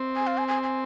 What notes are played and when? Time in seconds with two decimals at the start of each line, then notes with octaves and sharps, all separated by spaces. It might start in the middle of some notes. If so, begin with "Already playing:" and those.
Already playing: C4
0.16 G#5
0.27 F5
0.38 G#5
0.48 G#5
0.63 G#5